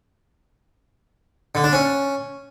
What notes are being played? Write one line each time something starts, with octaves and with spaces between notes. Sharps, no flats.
D3
D4
C#4